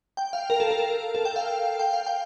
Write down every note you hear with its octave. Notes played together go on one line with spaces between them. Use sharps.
G5
F5
A#4
A4
A#4
A4
G5
F5
G5
F5
G5